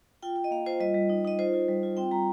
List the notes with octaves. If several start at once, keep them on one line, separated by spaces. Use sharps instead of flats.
F4 G5
F4 G5
D#5
A#3 F5
F4 C5
G3 D#5
G3
D#4
D#4 D#5
F4 C5
F4
G3
F4
C4 G5
G3 A#5